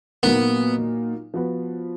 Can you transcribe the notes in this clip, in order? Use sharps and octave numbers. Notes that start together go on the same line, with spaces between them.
A#2 F#3 A#3 B3 D#4 A#4
F3 B3 F#4 B4